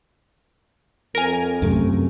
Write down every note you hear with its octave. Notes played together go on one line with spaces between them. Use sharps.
F2 A#4 G#5
F#2 C3 A3